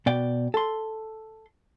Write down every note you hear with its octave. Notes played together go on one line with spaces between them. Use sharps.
B2 D5 G5
A4 C6